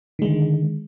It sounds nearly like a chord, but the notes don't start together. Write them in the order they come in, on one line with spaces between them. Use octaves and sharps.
D#3 G#3 D3